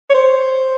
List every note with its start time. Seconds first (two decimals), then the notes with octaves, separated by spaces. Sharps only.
0.10 C#5
0.15 C5